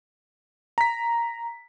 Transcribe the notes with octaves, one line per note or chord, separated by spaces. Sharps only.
A#5 B6